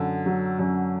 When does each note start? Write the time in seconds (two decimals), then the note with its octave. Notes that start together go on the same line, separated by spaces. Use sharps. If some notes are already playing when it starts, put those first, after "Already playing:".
Already playing: F#2 D3
0.26 F#3
0.59 F#2